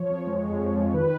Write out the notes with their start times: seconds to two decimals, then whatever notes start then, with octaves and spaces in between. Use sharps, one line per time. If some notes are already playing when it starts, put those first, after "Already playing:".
Already playing: F3 C#5
0.10 F2
0.27 G#3
0.44 F2
0.61 F3
0.77 F2
0.94 D#3 B4